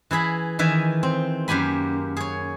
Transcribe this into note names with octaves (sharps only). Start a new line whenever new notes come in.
E3 E4 G#4 B5
D#3 E3 E5 G#5
C4
F#2 A#3 G4 G#5 B5
G#4 C#5